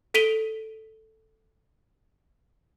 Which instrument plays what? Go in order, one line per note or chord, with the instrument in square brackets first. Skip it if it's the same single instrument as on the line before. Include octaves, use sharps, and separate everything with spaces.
[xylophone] A4 B6 D7 D#7 F7 G7